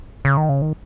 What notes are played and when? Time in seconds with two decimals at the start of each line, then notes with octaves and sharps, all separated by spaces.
0.25 C#3
0.37 D#3
0.49 C#3
0.62 D#3